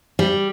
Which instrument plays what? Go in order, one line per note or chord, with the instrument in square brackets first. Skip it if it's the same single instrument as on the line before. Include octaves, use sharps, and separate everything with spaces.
[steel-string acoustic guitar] G3